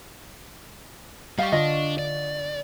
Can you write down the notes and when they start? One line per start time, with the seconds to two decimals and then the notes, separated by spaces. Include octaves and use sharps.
1.38 G3 G4 D#5 F5 C#6
1.52 D3 D4 F4 D#5
1.99 D5